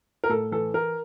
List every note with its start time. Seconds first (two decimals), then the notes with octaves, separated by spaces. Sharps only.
0.24 A#4
0.29 A2 A4
0.52 E3 A4
0.74 E3 A#4